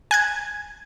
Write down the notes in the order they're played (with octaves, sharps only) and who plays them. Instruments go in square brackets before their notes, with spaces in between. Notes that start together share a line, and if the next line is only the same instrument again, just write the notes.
[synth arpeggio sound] G#5 F#6 G#6